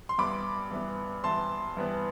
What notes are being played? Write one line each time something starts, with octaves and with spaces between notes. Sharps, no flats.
C6
G2 E3 B3 B5 D6
G2 E3 B3
G2 E3 B3 A5 C6
G2 E3 B3